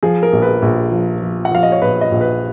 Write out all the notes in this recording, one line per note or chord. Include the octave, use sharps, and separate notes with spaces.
F3 G#4
A#4
A#1
B4
A#1
F3
F3
F#5
F3 F5
D#5
C#5
A#1 B4
D#5
A#1
B4